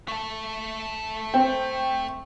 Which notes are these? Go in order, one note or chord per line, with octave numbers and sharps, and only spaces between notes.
A3 A4
C4 G5